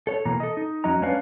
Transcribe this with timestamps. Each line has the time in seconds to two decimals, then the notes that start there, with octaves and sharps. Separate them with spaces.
0.07 A4 C#5
0.26 B2 E3 A#3 A#5
0.40 A4 D#5
0.57 D#4
0.84 F2 F#3 C#4 D#5 A#5
1.02 G#3 C#4 D4 B4 C#5 F5